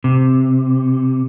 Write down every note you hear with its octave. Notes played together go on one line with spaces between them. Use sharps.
C3